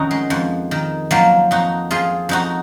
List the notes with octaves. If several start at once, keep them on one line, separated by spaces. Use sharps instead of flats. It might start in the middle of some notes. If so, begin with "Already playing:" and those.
Already playing: F2 D#3 C#4 D#4 F#4
G#3
F2
D#3
F3 F#3 A#3
F2 D#4 F#4
F3 F4 G#4
F2 D#4 F#4